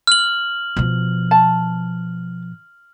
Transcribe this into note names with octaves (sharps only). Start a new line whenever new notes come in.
F6 F#7
B2 F3
A5